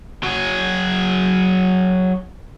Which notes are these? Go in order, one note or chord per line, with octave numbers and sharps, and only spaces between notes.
F#3 G#4